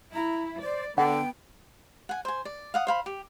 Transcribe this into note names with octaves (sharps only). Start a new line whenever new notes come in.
E4 A#5
C5 D5
D3 B3 F#5 G5
F#5 G#5
C5 G#5
D5
F5 F#5 D#6
C5 F5 B5
G4